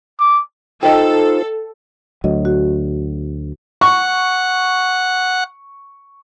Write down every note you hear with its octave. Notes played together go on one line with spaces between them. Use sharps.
D6
D#4 F4 A4 C5 D#5 G5
D2 F#3 D#5
F#4
F#5 C#6